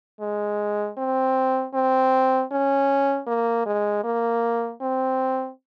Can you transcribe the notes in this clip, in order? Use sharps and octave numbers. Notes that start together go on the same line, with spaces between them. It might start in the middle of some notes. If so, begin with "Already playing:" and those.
G#3
C4
C4
C#4
A#3
G#3
A#3
C4